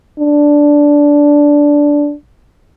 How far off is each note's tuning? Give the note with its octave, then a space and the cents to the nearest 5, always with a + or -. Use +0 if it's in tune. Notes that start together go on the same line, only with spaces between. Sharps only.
D4 -10